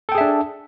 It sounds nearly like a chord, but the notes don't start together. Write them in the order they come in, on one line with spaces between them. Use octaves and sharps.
A4 G5 G#4 E5 D4